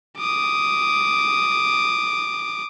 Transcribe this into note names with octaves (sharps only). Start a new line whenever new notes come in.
D6 D#6